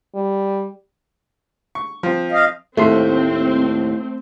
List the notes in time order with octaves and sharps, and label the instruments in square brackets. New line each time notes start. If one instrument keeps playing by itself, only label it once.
[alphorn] G3
[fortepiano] C#6
F3 C4
[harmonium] D#5 F5
[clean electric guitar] D#2 A2 C6 [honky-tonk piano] A3 [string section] C4